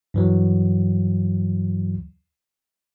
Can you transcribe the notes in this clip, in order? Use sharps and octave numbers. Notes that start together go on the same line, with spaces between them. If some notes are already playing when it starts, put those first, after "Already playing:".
G2 E3 F#3